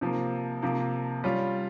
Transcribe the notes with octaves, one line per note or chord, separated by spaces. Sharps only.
C3 F3 A#3
C3 F3 A#3
G3 C#4 F4